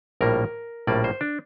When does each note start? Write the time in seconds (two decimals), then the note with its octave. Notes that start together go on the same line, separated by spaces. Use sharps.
0.21 A#1 A2 G3 A#3 A#4
0.87 A#1 A2 G3 A#3 D5
1.04 C5
1.21 D4